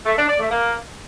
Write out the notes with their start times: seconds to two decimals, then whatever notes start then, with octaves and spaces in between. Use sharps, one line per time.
0.06 A3
0.17 D4
0.28 D5
0.39 A3
0.50 A#3